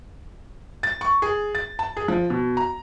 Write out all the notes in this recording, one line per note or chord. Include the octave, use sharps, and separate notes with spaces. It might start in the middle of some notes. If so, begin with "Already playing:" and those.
A6
C#6
G#4
A6
A5
G#4
F3
B2
A#5